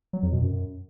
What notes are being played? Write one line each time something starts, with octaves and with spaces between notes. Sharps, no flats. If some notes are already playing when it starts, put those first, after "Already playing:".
F#3
F2
B2
F#2